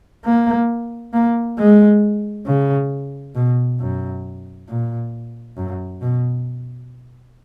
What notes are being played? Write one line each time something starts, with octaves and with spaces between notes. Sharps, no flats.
A#3
A#3
G#3
C#3
B2
F#2
A#2
F#2
B2